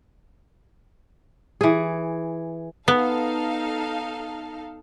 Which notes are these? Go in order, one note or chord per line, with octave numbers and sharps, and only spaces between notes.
E3 G#4
B3 D#4 A4 F5